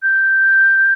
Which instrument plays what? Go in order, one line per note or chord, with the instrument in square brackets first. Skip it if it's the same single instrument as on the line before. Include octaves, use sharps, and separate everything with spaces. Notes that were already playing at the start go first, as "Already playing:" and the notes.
[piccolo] G6